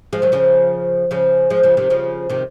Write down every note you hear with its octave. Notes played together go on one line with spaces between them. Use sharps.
F3 G#3
D#3 F#3
C#3 F3
C#3 F3
F3 G#3
C#3 F3
C3 D#3
C#3 F3
C3 D#3